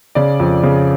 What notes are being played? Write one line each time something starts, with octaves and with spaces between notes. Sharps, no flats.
C#3 D5
F2
C#3